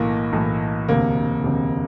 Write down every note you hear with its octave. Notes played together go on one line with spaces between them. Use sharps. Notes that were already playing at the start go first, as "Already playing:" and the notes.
Already playing: B1 A2 E3 A#3
B1 A2 E3
E1 D2 C3 A#3
E1 D2 C3